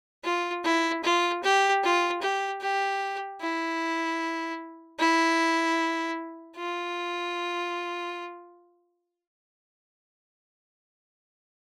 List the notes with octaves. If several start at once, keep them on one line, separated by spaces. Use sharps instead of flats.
F4
E4
F4
G4
F4
G4
G4
E4
E4
F4